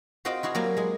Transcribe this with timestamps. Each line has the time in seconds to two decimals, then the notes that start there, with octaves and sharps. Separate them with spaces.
0.25 C4 F4 F#4 C5 D#5 G5
0.43 E4 F#4 G#4 F5
0.55 F#3 G3 A#3 G4 A#4 D5
0.77 G#3 G#4